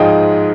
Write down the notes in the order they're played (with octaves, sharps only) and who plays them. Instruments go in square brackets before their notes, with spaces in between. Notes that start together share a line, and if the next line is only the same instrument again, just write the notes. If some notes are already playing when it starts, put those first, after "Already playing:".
Already playing: [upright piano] G#2 F3 G#3 D#5 F5 G5